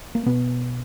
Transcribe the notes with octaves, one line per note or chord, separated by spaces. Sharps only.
A#3
B2 B3